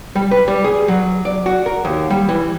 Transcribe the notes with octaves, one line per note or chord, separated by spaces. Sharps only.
G3
B4
G3
G#4
F#3
D5
F#4
A#4
D#2
G3
E3